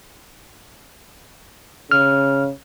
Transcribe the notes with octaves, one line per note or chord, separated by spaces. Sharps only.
C#3 F6